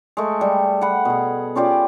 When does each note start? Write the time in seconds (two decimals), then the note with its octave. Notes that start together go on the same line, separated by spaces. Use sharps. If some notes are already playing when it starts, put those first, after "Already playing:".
0.17 G#3 A3
0.41 G3
0.81 F#5 B5
1.05 B2 G#4
1.55 C#4 F4 G4 D5